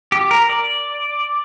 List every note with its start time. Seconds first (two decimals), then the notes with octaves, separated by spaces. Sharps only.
0.12 G4
0.31 A#4
0.49 D5